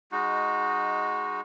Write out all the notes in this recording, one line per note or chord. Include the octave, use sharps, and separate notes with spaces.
G#3 D#4 F#4